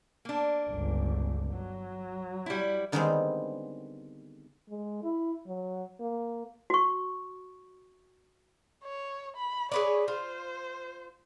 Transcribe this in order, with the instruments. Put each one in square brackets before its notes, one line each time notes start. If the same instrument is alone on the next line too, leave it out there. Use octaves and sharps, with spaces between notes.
[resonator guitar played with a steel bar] A#3 D4
[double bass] G1 C#2
F#3
[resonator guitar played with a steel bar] G3 E4
[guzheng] D3 D#3 G3 G#3 B3 C4
[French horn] G#3
E4
F#3
A#3
[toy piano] F#4 C#6
[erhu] C#5
B5
[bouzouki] G#4 B4 D5 [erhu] C#5
[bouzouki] F4 [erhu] C5